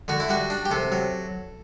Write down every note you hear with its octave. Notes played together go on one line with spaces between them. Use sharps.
D3 F#4
E4
G3 F#4
D4
G4
C3 A4
F#3